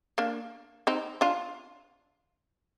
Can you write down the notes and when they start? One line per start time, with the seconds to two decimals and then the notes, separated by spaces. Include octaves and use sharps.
0.18 A#3 D4
0.87 C4 D#4
1.21 D4 F4